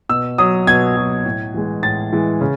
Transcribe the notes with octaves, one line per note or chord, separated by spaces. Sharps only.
B2 E6
F#3 D#6
B2 G#6
F#3
A2
E3 G#3
A2 A6
E3 G#3
C#3